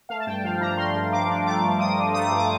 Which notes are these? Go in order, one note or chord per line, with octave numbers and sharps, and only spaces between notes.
A3 F5
A5
G2 G5
F3 F5
D4 A#5
A3 C6
G2
F3 D6
D4
A3 D6
G2
F3 D#6
D4
A3 D#6
G2
D6